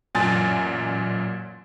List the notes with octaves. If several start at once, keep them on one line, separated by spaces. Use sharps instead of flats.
A1 F#2 A#2 G#5 A6